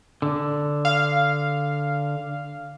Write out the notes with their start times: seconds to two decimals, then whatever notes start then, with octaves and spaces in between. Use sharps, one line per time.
0.22 D3
0.85 F5